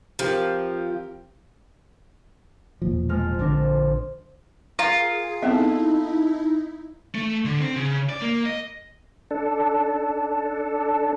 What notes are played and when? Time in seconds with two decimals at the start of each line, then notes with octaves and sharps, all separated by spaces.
0.19 F3 C4 G4 A#4
2.82 E1 A#2 F3
3.09 F2 G#3 F6
3.39 A#1 D3 C4 D4 A#4
4.79 F4 G#4 A#4
5.42 B3 C4 D#4 E4 A4 E5
7.15 A3
7.45 D3
7.60 C4
7.76 C#3
8.09 D5
8.22 A#3
8.46 D#5
9.31 D4 A4